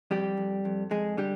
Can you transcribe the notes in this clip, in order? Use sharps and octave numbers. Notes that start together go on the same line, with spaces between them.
F2 G3 G4
F2
F2
F2 G#3 G#4
D3 G3 G4